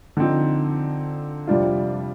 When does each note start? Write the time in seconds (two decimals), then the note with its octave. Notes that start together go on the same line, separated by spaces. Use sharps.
0.17 D3 F3 C4 D#4
1.47 F2 C3 G3 D4 F4